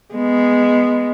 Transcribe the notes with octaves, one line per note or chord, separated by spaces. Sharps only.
G#3 B3